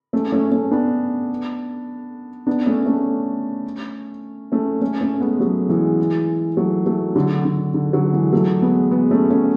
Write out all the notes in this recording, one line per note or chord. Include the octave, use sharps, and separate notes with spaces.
A3 C#4
A3 C#4
A3 C#4
B3 D4
B3 D4
A3 C#4
A3 C#4
A3 C#4
A3 C#4
A3 C#4
G#3 B3
F#3 A3
E3 G#3
F#3 A3
F#3 A3
D3 F#3
D3
D3
D3 F#3
E3 G#3
F#3 A3
G#3 B3
G#3 B3
A3 C#4
A3 C#4